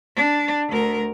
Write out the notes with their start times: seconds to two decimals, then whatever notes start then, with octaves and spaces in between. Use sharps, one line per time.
0.16 D4
0.69 D2 A#4